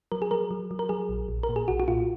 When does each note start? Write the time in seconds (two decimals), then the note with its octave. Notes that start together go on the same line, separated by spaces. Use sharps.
0.12 F#3 A#4
0.22 G#4
0.31 F#3 A#4
0.51 F#3
0.71 F#3
0.79 A#4
0.89 F#3 G#4
1.09 A#1
1.28 A#1
1.43 A#4
1.49 A#2
1.56 G#4
1.68 B1 F#4
1.80 F#4
1.88 A#2 F4